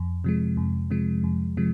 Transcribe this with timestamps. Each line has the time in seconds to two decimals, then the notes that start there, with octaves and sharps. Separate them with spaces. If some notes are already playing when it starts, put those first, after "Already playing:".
Already playing: F2
0.24 C3 F3 G#3
0.57 F2
0.90 C3 F3 G#3
1.24 F2
1.57 C3 F3 G#3